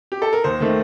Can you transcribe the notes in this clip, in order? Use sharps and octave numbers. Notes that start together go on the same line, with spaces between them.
G4
A4
A#4
D#2 C5
D#3 A3 C4